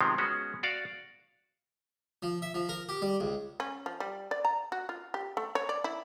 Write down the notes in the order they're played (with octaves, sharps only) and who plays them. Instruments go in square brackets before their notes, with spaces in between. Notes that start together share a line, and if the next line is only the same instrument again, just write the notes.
[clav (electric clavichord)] C3 D#3 F3 G#3 B3 C4
G#3 B3 C#4 F#4
F#4 D5 F5
[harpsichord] F3
E5
F3
A#4
G4
G3
C#2
[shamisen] C#4
F3
G3
D5
A#5
F#4
F4
G4
A3
C#5
D5
E4